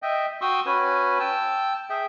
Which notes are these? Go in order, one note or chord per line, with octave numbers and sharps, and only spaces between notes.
D#5 E5 G5
F#4 G5 C6 C#6 D#6 E6
C#4 F#4 B4 G#5
G5 A5 E6
G#4 E5 G5